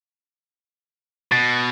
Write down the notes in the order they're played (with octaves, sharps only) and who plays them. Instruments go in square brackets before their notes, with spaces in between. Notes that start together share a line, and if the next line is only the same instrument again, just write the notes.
[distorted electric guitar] B2 [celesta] A6